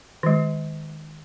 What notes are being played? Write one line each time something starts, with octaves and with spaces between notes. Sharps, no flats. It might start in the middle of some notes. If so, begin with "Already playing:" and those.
D#3 G#3